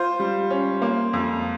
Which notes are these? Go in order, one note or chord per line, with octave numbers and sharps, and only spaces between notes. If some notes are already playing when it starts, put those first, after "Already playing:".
Already playing: F4 C5
G3
C#4
A#3
F2